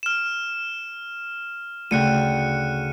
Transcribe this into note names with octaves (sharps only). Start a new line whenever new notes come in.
F6 E7
D2 C#3 G5 F#6 C#7 D#7